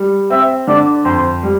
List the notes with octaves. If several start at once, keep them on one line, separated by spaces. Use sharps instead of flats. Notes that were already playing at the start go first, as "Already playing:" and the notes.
Already playing: G3
C4 E5
D3 D5
F2 C5
G3